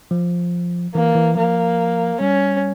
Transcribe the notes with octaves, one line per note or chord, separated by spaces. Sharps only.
F3
E3 A#3
E3
F3 A#3
G3 C#4